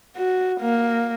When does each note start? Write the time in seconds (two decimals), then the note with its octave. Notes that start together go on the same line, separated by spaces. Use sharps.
0.17 F#4
0.60 A#3